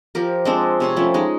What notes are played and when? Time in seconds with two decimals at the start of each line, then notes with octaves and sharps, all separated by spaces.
0.15 F3 G4 A#4
0.45 G#3 C4 D4
0.80 C3 C#5 C6
0.96 F3 G3 A3 C#4
1.14 G#3 D#4